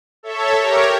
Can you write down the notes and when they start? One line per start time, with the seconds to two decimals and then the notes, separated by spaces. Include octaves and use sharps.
0.23 A4 C#5 E5
0.61 G4 A#4 C#5 A#5